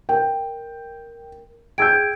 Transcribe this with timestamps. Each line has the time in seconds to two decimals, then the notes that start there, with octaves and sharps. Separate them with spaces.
0.09 A#4 G5
1.78 G#4 G5 E6 G6 G#6 D7